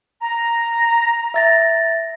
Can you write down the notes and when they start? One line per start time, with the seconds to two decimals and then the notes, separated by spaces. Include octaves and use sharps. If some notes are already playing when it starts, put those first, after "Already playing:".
0.22 A#5
1.34 E5 A6 A#6